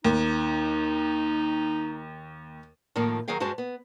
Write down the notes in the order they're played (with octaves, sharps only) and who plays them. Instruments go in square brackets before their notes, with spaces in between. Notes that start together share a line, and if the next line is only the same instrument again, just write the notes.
[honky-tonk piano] D#2 [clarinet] D#4
[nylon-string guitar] A2 D#3 F3 A#3
D#3 F#3 F#4 G#4 F5 G5
G2 G#3 F#4 C5 A5
B3